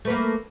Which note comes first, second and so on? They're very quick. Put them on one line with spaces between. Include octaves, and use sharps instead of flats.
A3 B4 A#3